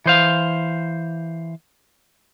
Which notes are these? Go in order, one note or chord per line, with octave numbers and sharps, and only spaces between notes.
E3 C5 F5